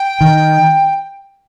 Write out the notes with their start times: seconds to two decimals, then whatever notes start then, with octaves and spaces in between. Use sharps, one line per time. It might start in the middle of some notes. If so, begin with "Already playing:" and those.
Already playing: G5
0.21 D#3